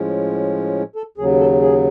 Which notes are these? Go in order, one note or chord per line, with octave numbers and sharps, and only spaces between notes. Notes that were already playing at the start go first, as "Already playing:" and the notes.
Already playing: A2 F3 G#3 C#4
A4
D#2 C#3 F#3 G#4
A4
G#4